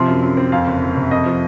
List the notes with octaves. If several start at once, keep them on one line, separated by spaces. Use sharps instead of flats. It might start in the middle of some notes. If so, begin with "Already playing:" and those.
Already playing: C3 F3 C6
F#2
F#2
C4
F2 F5
F#1
F#1
C3
F2 D#5
F3